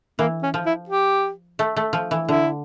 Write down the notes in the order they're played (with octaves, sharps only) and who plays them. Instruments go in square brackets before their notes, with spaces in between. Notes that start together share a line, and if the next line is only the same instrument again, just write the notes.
[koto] E3 [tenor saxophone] A#3
[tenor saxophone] C#4
[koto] F3
[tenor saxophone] E4
G4
[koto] A3
A3
F3
E3
[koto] D3 [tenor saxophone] E4